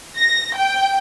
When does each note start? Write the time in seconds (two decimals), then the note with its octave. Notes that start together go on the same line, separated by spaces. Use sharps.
0.17 A#6
0.56 G5